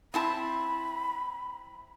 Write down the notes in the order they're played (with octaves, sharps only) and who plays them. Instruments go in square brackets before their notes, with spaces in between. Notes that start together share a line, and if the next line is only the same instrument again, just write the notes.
[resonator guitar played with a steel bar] C4 E4 A5 [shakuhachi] B5